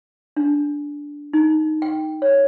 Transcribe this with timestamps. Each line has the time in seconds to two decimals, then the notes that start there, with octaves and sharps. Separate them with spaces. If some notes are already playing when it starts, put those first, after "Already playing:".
0.37 D4
1.33 D#4
1.82 G5
2.22 C#5